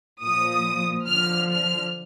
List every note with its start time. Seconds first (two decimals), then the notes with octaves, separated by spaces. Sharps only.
0.22 A#2 F3 D#6
1.07 D3 F3 F6
1.50 F6